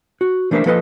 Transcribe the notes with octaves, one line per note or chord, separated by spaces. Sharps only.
F#4
E3 A3 D4 A#4 C5 E5
F3 A#3 A4 B4 C5 D#5